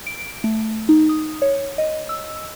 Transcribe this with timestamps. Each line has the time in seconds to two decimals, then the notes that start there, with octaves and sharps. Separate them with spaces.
0.07 D7
0.44 A3
0.89 D#4
1.09 D#6
1.42 C#5
1.78 D#5
2.09 E6